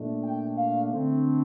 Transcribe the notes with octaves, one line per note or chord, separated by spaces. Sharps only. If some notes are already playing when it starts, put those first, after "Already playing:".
Already playing: A#2 A3 D4
G5
F5
D3 A3 C4